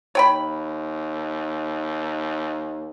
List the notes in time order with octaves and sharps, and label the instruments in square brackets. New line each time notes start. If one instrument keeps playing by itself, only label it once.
[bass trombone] D#2 [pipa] C#5 G5 B5